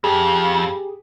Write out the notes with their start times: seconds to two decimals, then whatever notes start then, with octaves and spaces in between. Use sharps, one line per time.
0.04 F2 G4 G#4